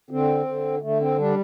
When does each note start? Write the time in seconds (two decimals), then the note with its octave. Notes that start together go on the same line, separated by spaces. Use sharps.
0.10 D3 C4
0.46 D3
0.82 D3 A3
1.01 C4
1.18 G3 D4